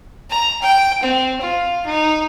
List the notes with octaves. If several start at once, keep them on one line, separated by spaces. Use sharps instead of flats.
A#5
G5
C4
F4
D#4